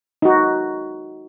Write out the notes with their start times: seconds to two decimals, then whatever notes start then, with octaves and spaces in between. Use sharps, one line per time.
0.22 D#4 F#4